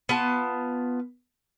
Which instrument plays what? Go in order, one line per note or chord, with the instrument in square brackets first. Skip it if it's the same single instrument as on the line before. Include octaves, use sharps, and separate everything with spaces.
[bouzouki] B3 F4 A5